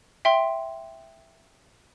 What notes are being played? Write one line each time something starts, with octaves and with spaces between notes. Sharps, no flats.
E5 G5 C6